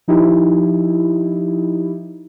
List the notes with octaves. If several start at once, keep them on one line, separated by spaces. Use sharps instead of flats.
F3 D#4 E4 G4